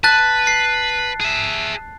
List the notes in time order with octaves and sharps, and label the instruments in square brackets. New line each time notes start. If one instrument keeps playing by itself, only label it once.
[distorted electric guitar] B4 [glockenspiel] A5 F#6 A6
[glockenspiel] C7
[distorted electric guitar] G#4 E5